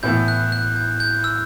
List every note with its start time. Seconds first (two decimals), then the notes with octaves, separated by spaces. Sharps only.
0.03 A2 E3 B3 E4 G6
0.28 F#6
0.52 F#6
0.76 G6
1.00 G6
1.24 E6